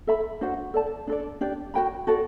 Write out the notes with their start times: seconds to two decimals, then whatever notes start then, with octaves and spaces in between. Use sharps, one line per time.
0.07 A4 E5 B5
0.41 D4 F#4 C5 F#5
0.74 A4 D5 A5
1.07 D4 A4 D5
1.41 D4 G4 D5
1.74 F#4 C5 G5 B5
2.07 F#4 A4 D5